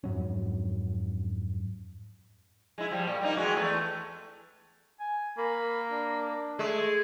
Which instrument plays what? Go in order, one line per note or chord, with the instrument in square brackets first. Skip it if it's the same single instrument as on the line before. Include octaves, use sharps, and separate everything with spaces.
[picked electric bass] F2 G#2 F#3 C#4
[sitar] G#3 E4
F3 G3
A#2 G3
G3 A#3 D#4
E3 G#3 F#4
E2 A3
[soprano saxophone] G#5
[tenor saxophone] A#3 [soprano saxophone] B5
[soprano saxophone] D4
[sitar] G#3 [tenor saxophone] A3